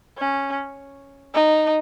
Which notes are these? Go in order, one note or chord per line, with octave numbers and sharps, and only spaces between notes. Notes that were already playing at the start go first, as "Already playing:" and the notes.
C#4
D#4